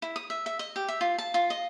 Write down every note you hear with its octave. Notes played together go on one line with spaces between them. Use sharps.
E4
D#6
E5
E5
D#5
G4
E5
F4
A5
F4
D#5